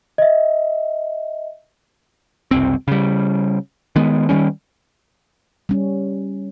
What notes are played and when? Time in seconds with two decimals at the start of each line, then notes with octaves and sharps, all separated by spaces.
0.18 D#5 E5
2.51 F#1 C2 C4
2.88 C#3 G3
3.96 D#3 G#3 B3
4.29 D#3 F#3 G3 C#4
5.69 G3 C#4